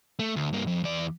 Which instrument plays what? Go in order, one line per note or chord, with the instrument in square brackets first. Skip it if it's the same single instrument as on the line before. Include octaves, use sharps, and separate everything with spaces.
[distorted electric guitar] A3
D2
G2 A#3
F2
E2 D5